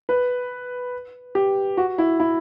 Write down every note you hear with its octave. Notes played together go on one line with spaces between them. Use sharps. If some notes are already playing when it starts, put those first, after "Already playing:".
B4
G4
F#4
E4
E4